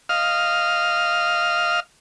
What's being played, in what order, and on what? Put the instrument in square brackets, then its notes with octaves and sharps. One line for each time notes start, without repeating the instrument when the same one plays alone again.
[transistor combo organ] D#5 F5 F6